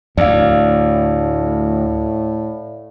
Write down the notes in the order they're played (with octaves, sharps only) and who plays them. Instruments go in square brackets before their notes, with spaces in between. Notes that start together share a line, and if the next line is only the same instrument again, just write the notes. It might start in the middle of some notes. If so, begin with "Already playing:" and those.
[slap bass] D2 [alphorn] A2 [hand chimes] D5 F5